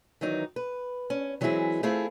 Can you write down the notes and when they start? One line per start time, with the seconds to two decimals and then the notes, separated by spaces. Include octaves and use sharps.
0.21 D#3 E3 F#3 D#4
0.56 B4
1.10 C#4
1.41 E3 F#3 G#3 C4 E4 G#4
1.83 A3 C4 E4 F4 G#4